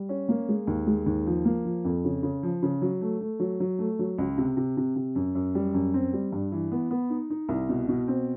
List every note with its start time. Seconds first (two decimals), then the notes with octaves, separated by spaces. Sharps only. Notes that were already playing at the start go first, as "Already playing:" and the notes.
Already playing: G3
0.09 C#4
0.29 A#3
0.48 G#3
0.67 D#2
0.87 G#3
1.06 D#2
1.26 F3
1.45 A#3
1.65 F3
1.85 F2
2.04 C#3
2.23 C#3
2.43 F3
2.63 C#3
2.82 F#3
3.01 A3
3.21 A3
3.40 F#3
3.60 F#3
3.79 A3
3.99 F#3
4.18 C#2
4.38 C3
4.57 C3
4.77 C3
4.96 C3
5.15 F#2
5.35 F#2
5.55 G3
5.74 F#2
5.94 C4
6.13 G3
6.32 G2
6.52 E3
6.72 B3
6.91 B3
7.10 D#4
7.30 D#4
7.49 C2
7.69 B2
7.88 B2
8.08 C4